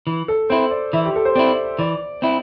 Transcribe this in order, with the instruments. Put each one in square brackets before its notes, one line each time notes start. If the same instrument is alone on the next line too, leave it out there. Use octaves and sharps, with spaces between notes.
[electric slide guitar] E3
[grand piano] A4
[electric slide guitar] C4 E4 [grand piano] C5
[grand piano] D5
[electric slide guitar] E3 [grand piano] E5
[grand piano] G4
A4
C5
[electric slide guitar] C4 E4 [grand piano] D5
[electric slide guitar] E3 [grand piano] D5
[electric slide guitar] C4 E4